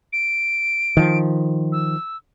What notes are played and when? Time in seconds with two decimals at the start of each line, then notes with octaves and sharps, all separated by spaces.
0.13 D7
0.97 D#3 F3
1.72 E6